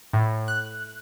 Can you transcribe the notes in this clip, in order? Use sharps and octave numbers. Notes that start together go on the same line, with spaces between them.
A2
F#6